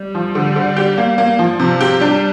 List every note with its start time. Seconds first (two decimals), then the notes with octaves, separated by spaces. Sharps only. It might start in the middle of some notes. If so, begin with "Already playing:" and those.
Already playing: G3
0.15 F3
0.35 D3
0.56 D3
0.77 G4
0.98 A#3
1.18 A#3
1.39 F3
1.59 C3 F3
1.81 G4
2.01 G3 D4